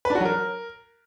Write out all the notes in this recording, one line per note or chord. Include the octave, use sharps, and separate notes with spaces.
B4
D4
F#4
F#3
A#4